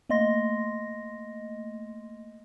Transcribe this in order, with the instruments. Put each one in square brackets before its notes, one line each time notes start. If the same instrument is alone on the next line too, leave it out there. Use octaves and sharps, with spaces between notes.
[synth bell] A3 A#3 D#5 C6 A#6